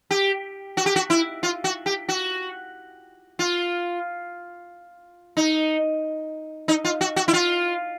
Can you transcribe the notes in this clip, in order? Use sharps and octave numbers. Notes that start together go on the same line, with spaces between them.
G4
F#4
G4
F#4
E4
F4
F#4
G4
F#4
F4
D#4
D#4
F4
F#4
F#4
E4
F4